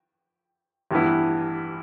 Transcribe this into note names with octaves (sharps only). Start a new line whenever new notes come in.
A1 G2 E3 B3 E4